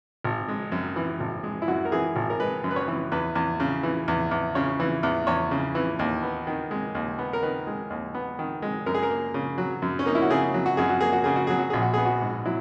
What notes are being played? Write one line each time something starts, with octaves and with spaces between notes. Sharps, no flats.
G#1
G#3
F#2
E3
G#1
G#3
E4
F#2 F#4
A#4
E3 G#4
G#1
A#4
G#3 B4
F#2
B4
C#5
E3
E2 B4
E2
C#3
E3
E2
E2
C#3 C#5
E3
E2
E2 C#5
C#3
E3
D#2
B3
D#3
G#3
D#2
B3
A#4
D#3 B4
G#3
D#2
B3
D#3
G#3
F#2 A#4
G#4
A#4
A#3
C#3
F#3
F#2
C#4
A#3 D#4
E4
F#4
C#3 G#4
F#3
F#4
F#2 G#4
F#4
A#3 G#4
F#4
C#3 G#4
F#4
F#3 G#4
F#4
A#1 G#4
F#4
B3 G#4
F#4
G#2
F#3 E4